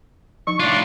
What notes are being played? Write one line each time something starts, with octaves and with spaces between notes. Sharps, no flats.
F3 D#4 C#6
A2 D4 F4